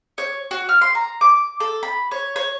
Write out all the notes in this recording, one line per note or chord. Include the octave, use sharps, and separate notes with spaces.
C#5
F#4
F6
C6
A#5
D6
A4
B5
C#5
C#5